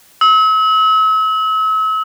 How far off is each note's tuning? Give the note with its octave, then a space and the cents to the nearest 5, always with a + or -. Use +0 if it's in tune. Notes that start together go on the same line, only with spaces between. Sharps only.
E6 -40